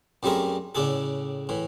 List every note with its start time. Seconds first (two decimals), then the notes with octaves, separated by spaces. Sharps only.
0.23 F#2 G3 A3 C4 G#4 A#4
0.75 A2 C#3 D4 G#4 A4
1.49 A2 E3